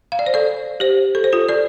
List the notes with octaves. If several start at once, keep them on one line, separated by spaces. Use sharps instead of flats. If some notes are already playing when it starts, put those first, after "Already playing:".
F5
D5
C5
A4 D5
G4 C5
A4
C5
F4 A4
A4 D5